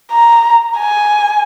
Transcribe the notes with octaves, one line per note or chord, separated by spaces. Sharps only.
A#5
G#5